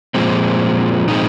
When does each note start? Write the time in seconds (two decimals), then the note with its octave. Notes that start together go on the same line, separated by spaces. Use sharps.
0.15 A#2 F3 G#3 C4
1.08 A#2 F3 G#3 C4 D#4